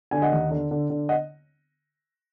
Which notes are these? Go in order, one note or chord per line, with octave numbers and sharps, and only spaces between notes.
D3 G#5
D#5 F#5
D#2
D3
D3
D3
D#5 F#5